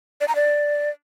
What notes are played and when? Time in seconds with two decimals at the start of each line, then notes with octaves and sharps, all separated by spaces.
0.21 D5
0.28 A#5
0.36 D5